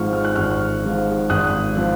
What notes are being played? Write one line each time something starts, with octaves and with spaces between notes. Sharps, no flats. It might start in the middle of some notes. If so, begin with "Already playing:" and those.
Already playing: G#1 G#2 F3 C4 F4 C#6 F6
F6
F#6
G#1 C#6 F6
G#2 F3 C4 F4
G#1 D#6 F#6
F3 C4 F4